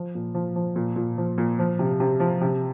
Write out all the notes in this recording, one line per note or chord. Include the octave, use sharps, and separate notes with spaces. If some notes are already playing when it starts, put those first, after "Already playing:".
Already playing: F3
A#2
F3
F3
A#2
A#2
F3
A#2
F3
C3
C3
F3
C3